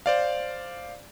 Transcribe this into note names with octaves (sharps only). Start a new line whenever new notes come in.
C5 D5 F5